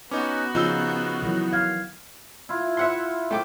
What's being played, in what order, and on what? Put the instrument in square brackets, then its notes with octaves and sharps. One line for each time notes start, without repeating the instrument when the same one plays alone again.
[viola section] B3 F#4 [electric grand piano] C#4 D#4 [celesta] B4 D6
[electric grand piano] C#3 D#4 [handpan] F3 [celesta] F4 E6 G7
[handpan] D#3 E3 F#3
[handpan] F5 [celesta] F6 G#6
[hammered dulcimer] E4 F4
[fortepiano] E5 F#5 C6
A3 G5 D6